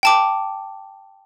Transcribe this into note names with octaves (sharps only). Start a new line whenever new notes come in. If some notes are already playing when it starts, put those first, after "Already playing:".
G5 A5 D6